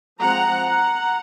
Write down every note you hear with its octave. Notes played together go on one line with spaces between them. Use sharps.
F3 G#3 C4 F#5 A#5
F#5 A#5